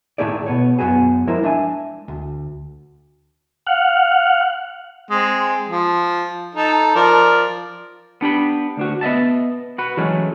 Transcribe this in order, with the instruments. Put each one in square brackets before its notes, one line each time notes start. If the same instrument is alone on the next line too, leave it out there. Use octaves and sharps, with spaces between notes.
[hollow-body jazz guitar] A2 D#3 A3 E4 G#4 D5
B2 B3 C#5
F#2 F#3 B3 F#4 G#4
F3 G#3 E4 A#4 C5
G#3 D4 E5 G#5
D2
[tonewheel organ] F5 F#5
[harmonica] G#3 C4
F3
D#4 A4
F3 A#4 D5
[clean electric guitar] B3 D4 G4 B5
D2 D4 F#4
B3 D#5 E5 A5
F#4 B4
E3 F#3 G#3 A3 C#4